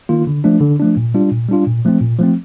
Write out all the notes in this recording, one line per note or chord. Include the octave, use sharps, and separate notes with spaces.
D#3 A#3 F4
D3
F3 A3 D4
D3
F3 A3 D4
A#2
G3 D4 F4
A#2
G3 D4 F4
A#2
F3 A3 C4
A#2
F3 A3 C4